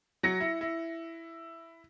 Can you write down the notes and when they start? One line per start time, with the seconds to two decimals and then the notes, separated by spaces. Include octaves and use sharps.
0.23 F#3 A#6 C#7
0.40 E4
0.61 E4